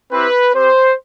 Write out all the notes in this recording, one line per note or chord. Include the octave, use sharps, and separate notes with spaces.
C4 E4 G4 B4
C4 G4 C5